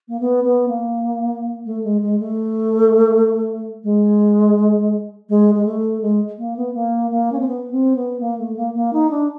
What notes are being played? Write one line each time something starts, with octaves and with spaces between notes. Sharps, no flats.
A#3
B3
B3
A#3
A3
G#3
G#3
A3
G#3
G#3
G#3
A3
G#3
A#3
B3
A#3
A#3
C#4
C4
B3
C4
B3
A#3
A3
A#3
A#3
D#4
D4